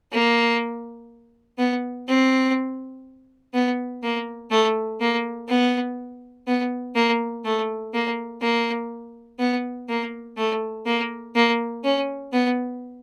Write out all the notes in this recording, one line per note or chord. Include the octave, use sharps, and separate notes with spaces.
A#3
B3
C4
B3
A#3
A3
A#3
B3
B3
A#3
A3
A#3
A#3
B3
A#3
A3
A#3
A#3
C#4
B3